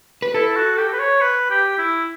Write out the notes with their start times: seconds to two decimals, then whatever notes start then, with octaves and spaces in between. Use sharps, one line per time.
0.22 B4
0.34 E4 A4
0.56 F#4
0.77 G4
0.93 B4
0.99 C#5
1.21 B4
1.50 G4
1.78 E4